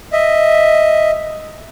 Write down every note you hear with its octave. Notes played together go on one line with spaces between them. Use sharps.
D#5 E5